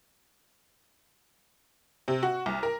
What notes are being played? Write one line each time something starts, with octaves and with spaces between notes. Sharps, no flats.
C3
F#4
C2
A#4